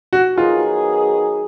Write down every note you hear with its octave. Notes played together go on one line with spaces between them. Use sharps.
F#4
D#3 F#3 B3 D#4 F4 G#4